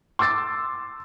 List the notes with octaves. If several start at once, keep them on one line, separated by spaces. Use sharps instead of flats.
C6 D6 E6 A6